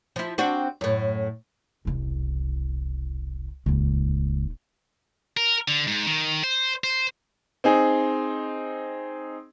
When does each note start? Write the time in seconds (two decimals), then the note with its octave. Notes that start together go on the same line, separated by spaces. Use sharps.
0.16 F3 E4
0.38 C4 D4 F#4
0.81 F#2 A2
1.85 E1 C2
3.66 D#1 C#2 D#4
5.37 A#4
5.68 D3
5.87 G#2
6.07 D#3
6.44 C5
6.84 C5
7.64 C4 D#4 G#4